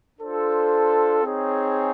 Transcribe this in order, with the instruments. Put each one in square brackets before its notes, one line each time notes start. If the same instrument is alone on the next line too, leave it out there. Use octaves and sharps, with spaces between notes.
[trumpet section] D4 F4 A4 C5
C4 D#4 G#4 C#5